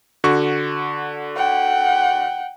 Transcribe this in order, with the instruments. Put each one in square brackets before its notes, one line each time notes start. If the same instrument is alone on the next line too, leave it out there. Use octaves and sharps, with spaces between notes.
[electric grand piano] D3 F#4 C#6
[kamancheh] F#5 G5